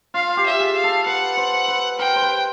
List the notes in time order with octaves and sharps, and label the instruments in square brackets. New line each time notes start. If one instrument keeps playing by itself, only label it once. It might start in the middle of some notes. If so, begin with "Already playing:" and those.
[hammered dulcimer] F4 [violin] F5
[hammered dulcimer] G4
[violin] E5
[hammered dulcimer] G#4
[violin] F5
[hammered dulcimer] A4
[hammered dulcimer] B4 [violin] F#5
[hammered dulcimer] C5
B4
[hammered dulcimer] A#4 [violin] G5
[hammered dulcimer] C5
B4